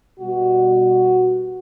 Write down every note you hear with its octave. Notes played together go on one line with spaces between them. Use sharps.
B2 G3 F#4